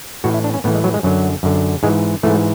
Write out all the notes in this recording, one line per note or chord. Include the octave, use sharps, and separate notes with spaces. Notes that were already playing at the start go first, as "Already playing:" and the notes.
A2 E3 F#4
E4
D4
C#4
A2 E3 B3
G#3
F#3
G#3
F#2 D3 F#3
F#2 D3
G#2 E3 G#3
G#2 E3 A3